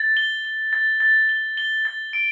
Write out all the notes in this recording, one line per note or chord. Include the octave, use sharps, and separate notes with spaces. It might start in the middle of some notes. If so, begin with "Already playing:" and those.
Already playing: A6
G7
G7
A6
A6
G7
G7
A6
D7